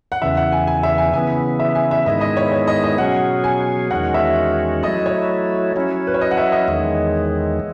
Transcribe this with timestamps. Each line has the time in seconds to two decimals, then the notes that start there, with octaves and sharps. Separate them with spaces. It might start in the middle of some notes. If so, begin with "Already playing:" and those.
0.12 F#5
0.22 E2 C#3 E3 E5
0.37 F#5
0.52 G#5
0.67 G#5
0.83 E5
0.98 G#5
1.14 C#3 E3 B3 G#5
1.60 E5
1.75 G#5
1.91 E5
2.06 G#2 D#3 G#3 B3 E4 D#5
2.21 D#5
2.37 C#5
2.52 C#5
2.67 D#5
2.84 D#5
2.98 B2 F#3 C#4 G#4 F#5
3.44 G#5
3.91 E2 D#3 G#3 C#4 F#4 F#5
4.14 E5
4.83 F#3 A3 E4 D#5
5.06 C#5
5.76 F#3 C#4 E4
6.07 B4
6.14 C#5
6.21 D#5
6.31 F#5
6.37 E5
6.52 D#5
6.68 E2 D#3 G#3